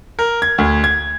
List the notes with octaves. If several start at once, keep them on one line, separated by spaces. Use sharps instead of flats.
A#4
G#6
D2
G#6